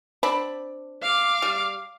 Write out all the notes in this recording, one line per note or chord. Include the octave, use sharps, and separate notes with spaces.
C4 D4 B5
F5 D6
G3